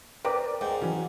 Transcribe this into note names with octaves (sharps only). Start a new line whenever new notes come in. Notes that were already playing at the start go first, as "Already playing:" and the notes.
C4 G4 A#4 B4 D5 D6
G#2 G5
E3 F#3 C#4